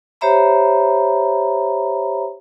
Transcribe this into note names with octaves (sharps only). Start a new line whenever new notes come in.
G4 C5 C#5 E5 A#5 B5